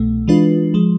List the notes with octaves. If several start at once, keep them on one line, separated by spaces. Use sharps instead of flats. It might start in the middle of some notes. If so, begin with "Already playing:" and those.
Already playing: C2 B2 A3
E3 G#3 D4 F4 B4
F3 G#3